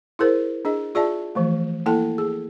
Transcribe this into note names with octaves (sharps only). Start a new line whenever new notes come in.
E4 G#4 A#4 C5
D4 G#4 D#5
F4 G#4 D5 E5 A5
E3 F3 A3
A#3 E4 A4 G5 A5
G#4